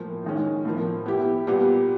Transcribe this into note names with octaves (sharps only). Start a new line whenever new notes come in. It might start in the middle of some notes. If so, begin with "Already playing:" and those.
Already playing: A2 F3 A#3
D#3 G#3 C#4
A2 F3 A#3
B3 E4 G4
A#2 G3 B3